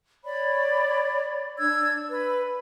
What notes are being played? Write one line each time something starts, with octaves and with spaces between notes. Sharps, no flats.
C#5 D5 B5
D4 E6 G#6
B4